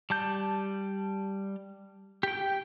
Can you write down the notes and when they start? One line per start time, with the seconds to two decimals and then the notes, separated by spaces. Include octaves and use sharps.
0.10 G3 A5 G6
2.23 G4 G5